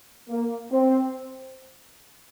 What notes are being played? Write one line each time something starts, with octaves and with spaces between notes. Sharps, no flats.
A#3
C4